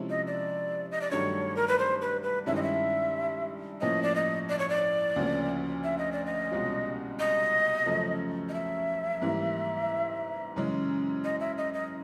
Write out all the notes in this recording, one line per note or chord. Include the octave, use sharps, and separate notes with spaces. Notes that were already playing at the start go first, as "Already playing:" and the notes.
Already playing: C3 F3 G#3 C#4 E4
D#5
D5
D#5
D5
G2 D#3 F#3 A3 D4 C#5
A#4
B4
C5
B4
B4
G2 D#3 G#3 C#4 E4 E5
D#5
E5
A2 F3 A#3 C#4 D#5
D5
D#5
D5
C#5
D5
D2 C#3 F3 A#3
E5
D#5
D5
D#5
C2 B2 G#3 C#4 F4
D#5
F#2 C#3 F3 A3
D#5
E5
G#2 E3 G3 A#3
F#2 C#3 E3 G#3 C#4
D#5
E5
D#5
D#5